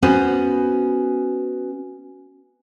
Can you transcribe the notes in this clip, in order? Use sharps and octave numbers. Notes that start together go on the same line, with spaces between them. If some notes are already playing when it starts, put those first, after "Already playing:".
B3 C#4 F#4 B4 C5